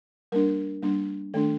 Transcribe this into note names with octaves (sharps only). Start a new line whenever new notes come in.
G3 A#3 D4 A#4
G3 A#3 D4
D#3 A3 D4 A4